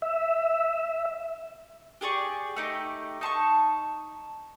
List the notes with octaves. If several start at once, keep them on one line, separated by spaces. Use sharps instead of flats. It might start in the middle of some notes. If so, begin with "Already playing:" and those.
E5
G4 G#4 D5 C#6
A3 D#4 G4
D#4 A5 C6 C#6